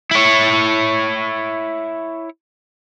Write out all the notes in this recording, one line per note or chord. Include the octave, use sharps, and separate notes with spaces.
E4 C#5